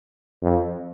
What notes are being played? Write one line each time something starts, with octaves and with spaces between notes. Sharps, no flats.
F2